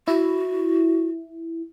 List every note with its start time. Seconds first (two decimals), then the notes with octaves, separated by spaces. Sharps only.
0.08 E4 F#4